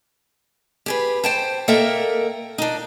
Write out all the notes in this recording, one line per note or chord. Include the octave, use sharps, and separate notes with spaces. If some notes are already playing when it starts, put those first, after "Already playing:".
G4 G#4 B4
C5 G5 A5
A#3 A4 A#4 D#5 E5 G5
D4 D#4